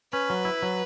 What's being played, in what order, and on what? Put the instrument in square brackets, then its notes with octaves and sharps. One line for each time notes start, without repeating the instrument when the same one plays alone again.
[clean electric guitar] C#4 [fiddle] B4
[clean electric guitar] F#3
E4
F#3